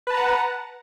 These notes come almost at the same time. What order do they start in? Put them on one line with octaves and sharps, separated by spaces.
B4 A5 A#5 F#5